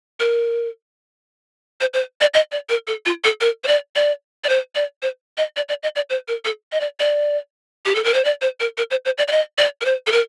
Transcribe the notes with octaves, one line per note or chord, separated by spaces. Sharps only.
A#4
C5
C5
D5
D#5
D5
A#4
A4
F4
A4
A#4
C5
D5
D5
D5
C5
D5
C5
D#5
D5
D5
D#5
D5
C5
A#4
A4
D#5
D5
D5
G4
A4
A#4
C5
D5
C5
A#4
A#4
C5
C5
D5
D5
D#5
D5
A#4
C5
A4
A#4